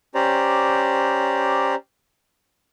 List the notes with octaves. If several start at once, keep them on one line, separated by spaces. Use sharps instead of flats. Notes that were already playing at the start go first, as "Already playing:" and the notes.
C#4 G4 C5 D5 A#5